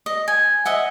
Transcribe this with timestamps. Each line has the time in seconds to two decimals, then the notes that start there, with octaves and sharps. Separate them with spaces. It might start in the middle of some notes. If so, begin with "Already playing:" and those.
0.06 D#5
0.28 G#5
0.65 D#5 E5 F#5